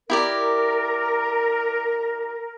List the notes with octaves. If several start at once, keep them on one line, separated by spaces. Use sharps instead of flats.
E4 G4 A#4 D5